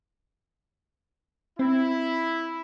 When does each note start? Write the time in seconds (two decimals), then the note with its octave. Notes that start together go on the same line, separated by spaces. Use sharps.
1.59 C4 E4